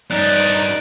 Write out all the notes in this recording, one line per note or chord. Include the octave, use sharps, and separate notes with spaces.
G2 C#4 D#4 D5 F#6